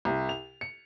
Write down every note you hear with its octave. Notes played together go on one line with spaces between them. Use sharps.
C2
F7
C#7